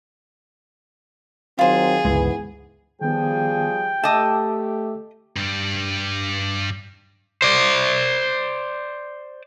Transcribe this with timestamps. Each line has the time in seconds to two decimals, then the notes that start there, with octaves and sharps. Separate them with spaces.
1.59 D#3 F#3 C4 F4 G#4 C5
2.05 G1 C#2 G#2 E3 G#3 B3
3.01 D#3 F3 G3 B3 G#4 G5
4.03 A3 G4 D#5 E5 A5 D6 E6
5.36 G2 G3
7.42 C5 D5